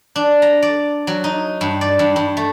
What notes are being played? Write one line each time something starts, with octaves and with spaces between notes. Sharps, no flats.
D4
A#5
D5
F#3
D#4
G2
D5
G2
G2
A3